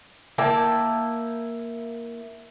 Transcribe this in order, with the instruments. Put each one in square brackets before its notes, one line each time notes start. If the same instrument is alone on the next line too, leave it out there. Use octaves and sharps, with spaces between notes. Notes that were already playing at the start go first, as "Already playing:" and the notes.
[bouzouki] A#3 E4 G5 A5